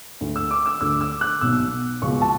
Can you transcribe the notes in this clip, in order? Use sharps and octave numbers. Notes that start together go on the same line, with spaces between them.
D2 D3
E6
D6
E6
D2 D3 E6
E6
F#6
B1 B2 E6
C#2 B2 C#6
A5